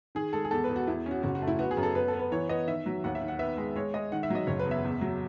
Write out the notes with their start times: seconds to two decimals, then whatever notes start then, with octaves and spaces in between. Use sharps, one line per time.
0.15 D#3 G#4
0.33 G#3 A4
0.45 G#4
0.51 E2 A4
0.64 B4
0.70 E2
0.76 F#4
0.87 E2 E4
1.06 C#4
1.11 F#4
1.23 F#1 F#4
1.35 F#4
1.42 A3
1.48 E4
1.59 B3 F#4
1.71 G#4
1.77 F#2
1.83 A4
1.95 B3 B4
2.08 A4
2.13 B3
2.19 B4
2.32 E3 C#5
2.49 B3 D#5
2.67 D#3 E5
2.86 F#3
3.04 D#2 F#5
3.15 E5
3.22 D#3
3.28 F#5
3.39 B3 E5
3.57 G#3
3.76 G#3 C#5
3.94 G#3 D#5
4.12 D#3 F#5
4.23 E5
4.30 F#3 D#5
4.47 F#1 C#5
4.59 B4
4.66 E2
4.71 E5
4.84 E2
5.01 F#3